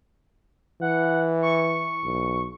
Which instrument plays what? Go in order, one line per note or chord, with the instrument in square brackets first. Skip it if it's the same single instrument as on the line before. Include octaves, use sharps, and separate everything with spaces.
[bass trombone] E3 [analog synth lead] F#5
[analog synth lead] C#6
[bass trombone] B1